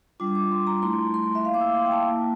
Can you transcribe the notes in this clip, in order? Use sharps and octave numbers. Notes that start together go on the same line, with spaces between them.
G3 D4 F4 D6
D6
C6
A#5
A3 E4 C6
C6
E5
A#3 E4 F5
D6
E6
C6
G5
A5
A#3 E4